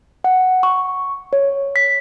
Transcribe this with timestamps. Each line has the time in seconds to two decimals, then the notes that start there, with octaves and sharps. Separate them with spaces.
0.24 F#5
0.63 C#6
1.33 C#5
1.76 B6